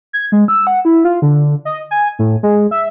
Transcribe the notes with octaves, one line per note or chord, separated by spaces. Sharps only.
G#6
G#3
E6
F#5
E4
F4
D3
D#5
G#5
A2
G#3
E5